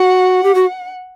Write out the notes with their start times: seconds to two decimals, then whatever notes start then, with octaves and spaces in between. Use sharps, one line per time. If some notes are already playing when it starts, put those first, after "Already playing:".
Already playing: F#4 F#5
0.43 G4
0.55 F#4